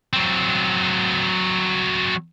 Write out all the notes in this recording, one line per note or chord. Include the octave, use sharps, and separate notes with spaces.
F#3 C4